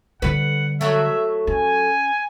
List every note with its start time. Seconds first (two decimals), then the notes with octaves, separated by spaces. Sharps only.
0.22 D3 G3 B4 F#5
0.81 F#3 A3 E5
1.47 C#4 G#5